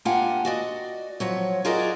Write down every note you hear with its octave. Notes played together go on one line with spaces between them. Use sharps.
A#3 D4 F4 G4 F#5 G#5
F#4 D5 D#5
F3 F#3 C#5
F4 F#4 G#4 A#4 D5 D#5